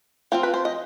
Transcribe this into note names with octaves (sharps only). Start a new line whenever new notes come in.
F3 C4 F4 C5
B4
C5
D#5